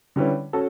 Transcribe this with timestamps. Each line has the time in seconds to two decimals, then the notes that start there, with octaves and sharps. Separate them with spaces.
0.16 D3 G3 C#4 E4 B4
0.53 C#4 F#4 A4